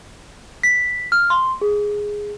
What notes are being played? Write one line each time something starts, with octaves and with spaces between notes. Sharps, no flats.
B6
F6
C6
G#4